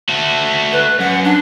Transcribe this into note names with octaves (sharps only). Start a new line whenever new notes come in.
A3 F#4
B4
F#2 F#5
D4